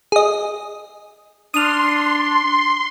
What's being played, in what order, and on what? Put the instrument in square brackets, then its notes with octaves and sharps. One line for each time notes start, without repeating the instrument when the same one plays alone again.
[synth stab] G#4 D#5
[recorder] D4 [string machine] C6 [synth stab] D#6 F6